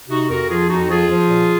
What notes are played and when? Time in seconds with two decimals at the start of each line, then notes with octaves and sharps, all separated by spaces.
0.09 C3 D#4 F#4
0.29 F2 F#4 A#4
0.49 F3 F4 G#4
0.69 F2 D#4 F#4
0.89 F3 F4 G#4
1.09 F3
1.28 A#2